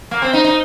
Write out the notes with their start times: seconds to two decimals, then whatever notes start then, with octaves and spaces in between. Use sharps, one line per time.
0.11 A#3
0.22 C4
0.33 D#4
0.44 D#4